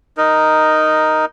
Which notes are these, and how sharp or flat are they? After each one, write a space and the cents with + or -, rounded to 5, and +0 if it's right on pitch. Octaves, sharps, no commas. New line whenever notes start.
D#4 +0 A#4 +0